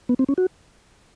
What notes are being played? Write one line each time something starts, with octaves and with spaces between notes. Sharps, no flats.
B3
C4
C#4
F#4